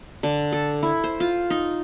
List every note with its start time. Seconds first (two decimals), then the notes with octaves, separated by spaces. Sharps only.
0.23 D3
0.52 A4
0.83 E4
1.04 C5
1.20 F4
1.50 D#4